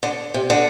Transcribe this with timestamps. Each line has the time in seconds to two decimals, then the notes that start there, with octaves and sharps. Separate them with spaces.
0.03 D3
0.34 C3
0.50 D3